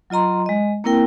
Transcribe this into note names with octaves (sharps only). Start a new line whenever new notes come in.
F#3 F4 D#5 A#5 C6
G#3 D#5
A#3 C4 E4 A#4 G5